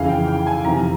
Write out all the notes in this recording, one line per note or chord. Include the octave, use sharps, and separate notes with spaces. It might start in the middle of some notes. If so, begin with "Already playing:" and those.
Already playing: F2 C#3 E3 F5
G5
G5
G#5
F2 C3 E3 A#5